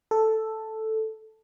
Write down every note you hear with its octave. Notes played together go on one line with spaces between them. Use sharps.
A4